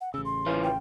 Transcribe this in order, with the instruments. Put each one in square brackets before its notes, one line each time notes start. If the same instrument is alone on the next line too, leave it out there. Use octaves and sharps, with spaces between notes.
[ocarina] F#5
[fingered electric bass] A1 C#3 [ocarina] E6
[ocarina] C6
[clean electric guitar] E3 C#4 F4
[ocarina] G5